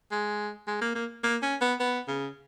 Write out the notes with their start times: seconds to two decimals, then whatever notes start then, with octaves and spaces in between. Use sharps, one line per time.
0.11 G#3
0.67 G#3
0.82 A#3
0.95 A#3
1.23 A#3
1.42 C#4
1.61 B3
1.80 B3
2.08 C#3